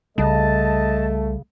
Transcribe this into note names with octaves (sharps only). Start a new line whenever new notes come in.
C2 C#3 G3 A3 D#5 A5